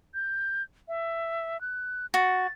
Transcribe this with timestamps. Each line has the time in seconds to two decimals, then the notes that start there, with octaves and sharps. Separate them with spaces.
0.14 G6
0.88 E5
1.61 F#6
2.14 F#4 A6